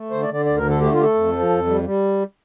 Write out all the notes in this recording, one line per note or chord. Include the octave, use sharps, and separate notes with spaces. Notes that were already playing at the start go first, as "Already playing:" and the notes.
Already playing: A3
D3 C5
D5
D3
D5
D2 D5
A#4
D3
A4
A3 G4
F4
A3 G4
A4
F2
F3
F2
G3
G3